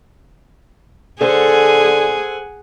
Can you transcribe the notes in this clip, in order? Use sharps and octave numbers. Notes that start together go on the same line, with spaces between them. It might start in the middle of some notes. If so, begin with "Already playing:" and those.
D3 G#4 A4 C5 F#5 G#5